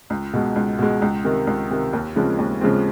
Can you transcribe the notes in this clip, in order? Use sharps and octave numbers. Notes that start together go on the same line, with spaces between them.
C#2
B2 G#3
C#2
B2 G#3
C#2
C3 D#3
C#2
C3 D#3
D#2
C#3 F3 G#3 C4
D#2
C#3 F3 G#3 C4